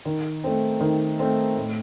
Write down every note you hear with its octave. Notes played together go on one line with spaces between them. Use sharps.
D#3
A3 C4
D#3
A3 C4
A2